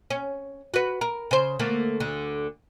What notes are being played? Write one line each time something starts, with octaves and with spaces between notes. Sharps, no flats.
C#4
F#4 B4
A#4
C#3 C5
D3 A3 A#3
D2 D3